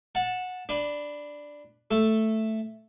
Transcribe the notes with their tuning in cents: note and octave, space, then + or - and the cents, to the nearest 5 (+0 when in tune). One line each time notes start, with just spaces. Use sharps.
F#5 -15 A5 +0
D4 +0 B4 +0
A3 +0 A4 +0